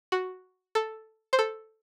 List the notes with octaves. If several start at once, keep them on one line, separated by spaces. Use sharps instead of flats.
F#4
A4
C5
A4